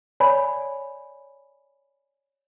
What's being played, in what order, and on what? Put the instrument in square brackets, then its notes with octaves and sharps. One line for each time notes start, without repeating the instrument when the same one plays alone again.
[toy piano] C#5 D5 G#5 B5